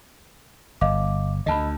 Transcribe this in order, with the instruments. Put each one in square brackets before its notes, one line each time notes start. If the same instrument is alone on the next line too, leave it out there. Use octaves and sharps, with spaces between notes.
[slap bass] G1 [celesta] D#5 F5 D6
[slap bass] D2 D3 [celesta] D#5 A5 B5